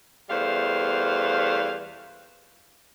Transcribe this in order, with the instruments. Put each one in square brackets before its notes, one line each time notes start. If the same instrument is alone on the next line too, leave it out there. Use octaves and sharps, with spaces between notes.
[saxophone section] E2 G3 A3 C5 F5